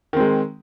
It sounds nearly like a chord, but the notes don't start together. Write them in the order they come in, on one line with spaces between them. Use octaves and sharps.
D#3 C4 G#3